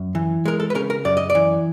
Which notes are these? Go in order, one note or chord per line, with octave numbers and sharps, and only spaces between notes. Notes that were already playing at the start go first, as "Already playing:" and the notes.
Already playing: F#2
E3
G#3 A#4
A4
B4
C#3 A#4
A#4
F#2 D5
D#5
D5
E3